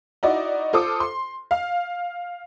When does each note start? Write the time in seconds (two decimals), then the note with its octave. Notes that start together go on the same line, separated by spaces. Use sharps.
0.23 D#4 E4 F#4 D5 D#5
0.73 F4 A4 C5 D6 D#6
1.00 C6
1.51 F5